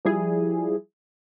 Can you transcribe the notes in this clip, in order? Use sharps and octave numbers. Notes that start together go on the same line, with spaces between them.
F3 G3 E4 G#4